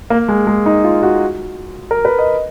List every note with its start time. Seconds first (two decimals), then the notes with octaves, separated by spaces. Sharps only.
0.10 A#3
0.28 G#3
0.47 G#3
0.66 D#4
0.84 F4
1.03 F#4
1.91 A#4
2.05 B4
2.19 D#5